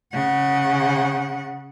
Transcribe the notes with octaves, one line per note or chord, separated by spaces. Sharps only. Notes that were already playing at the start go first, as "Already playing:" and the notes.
C#3 F#5